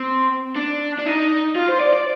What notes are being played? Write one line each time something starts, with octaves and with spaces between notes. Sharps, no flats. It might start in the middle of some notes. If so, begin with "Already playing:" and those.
Already playing: C4
D4
D4
D#4
F4
C5
D5
D5